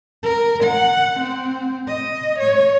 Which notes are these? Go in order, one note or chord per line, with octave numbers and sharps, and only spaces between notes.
A#4
F#5
C4
D#5
C#5